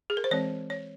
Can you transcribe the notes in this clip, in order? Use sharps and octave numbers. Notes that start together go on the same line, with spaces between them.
G#4
A#4
C5
E3 G#3 C4 C#5
C#5